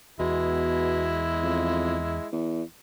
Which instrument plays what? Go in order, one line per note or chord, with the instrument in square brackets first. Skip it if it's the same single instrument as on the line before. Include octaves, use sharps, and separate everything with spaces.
[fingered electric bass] E2 [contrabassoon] B2 [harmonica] G#3 E4
[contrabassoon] F2
E2